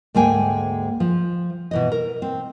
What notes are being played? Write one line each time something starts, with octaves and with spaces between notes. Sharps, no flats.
D2 G#2 G#3 A#3 G5 G#5
F3
B2 E3 D#5
A#4
C4